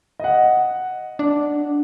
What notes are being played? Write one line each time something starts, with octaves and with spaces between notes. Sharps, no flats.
D#5 F#5
D4